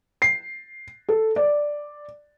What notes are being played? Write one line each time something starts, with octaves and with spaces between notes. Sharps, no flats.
C7
A4
D5